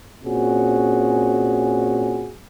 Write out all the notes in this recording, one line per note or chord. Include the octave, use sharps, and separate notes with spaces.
A#2 C4 C#4 F#4 G#4